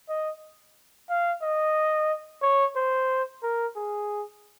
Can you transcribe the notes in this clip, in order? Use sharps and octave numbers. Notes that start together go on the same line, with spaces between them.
D#5
F5
D#5
C#5
C5
A#4
G#4